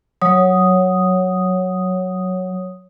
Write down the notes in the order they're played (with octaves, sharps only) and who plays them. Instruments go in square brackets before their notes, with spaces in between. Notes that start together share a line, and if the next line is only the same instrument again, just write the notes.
[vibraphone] F#3 C#5 D#6